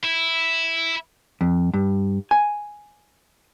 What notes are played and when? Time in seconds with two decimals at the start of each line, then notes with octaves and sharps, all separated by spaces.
0.04 E4
1.41 F2
1.74 G2
2.31 G#5